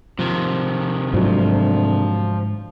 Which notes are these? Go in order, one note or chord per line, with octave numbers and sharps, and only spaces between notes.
C3 D#3 F3
D2 G#2 F3 F#3